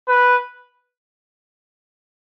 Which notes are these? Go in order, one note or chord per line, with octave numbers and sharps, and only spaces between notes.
B4